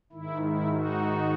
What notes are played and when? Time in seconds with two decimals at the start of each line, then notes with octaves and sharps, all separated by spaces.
0.13 G#2 D#3 E4
0.42 E4
0.72 D#4 F#4